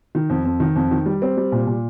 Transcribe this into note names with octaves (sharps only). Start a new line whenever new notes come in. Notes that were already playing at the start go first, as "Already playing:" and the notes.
D#3
F2
F2
D#3
F2
D#3
G3
C4
G3
A#2
A#2